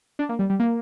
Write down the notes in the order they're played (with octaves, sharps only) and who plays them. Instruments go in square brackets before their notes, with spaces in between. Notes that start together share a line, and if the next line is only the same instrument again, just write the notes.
[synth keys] D4
A#3
G3
G3
A#3